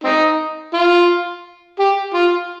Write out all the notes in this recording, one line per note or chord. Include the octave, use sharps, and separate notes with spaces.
C4 D#4
F4
G4
F4